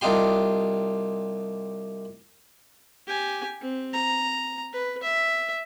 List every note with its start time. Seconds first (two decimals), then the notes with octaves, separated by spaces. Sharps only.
0.01 C2 D4 D#4 F4 G4 C6
3.08 G4 G#5
3.61 C4
3.93 A#5
4.73 B4
5.03 E5